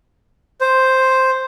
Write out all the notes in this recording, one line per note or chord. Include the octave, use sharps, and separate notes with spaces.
C5